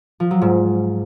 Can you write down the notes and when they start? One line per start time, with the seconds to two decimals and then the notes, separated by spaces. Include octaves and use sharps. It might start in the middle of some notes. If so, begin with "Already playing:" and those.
0.20 F3
0.31 F#3
0.42 G#2